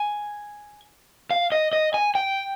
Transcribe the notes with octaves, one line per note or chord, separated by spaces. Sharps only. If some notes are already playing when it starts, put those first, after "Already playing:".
Already playing: G#5
F5
D#5
D#5
G#5
G5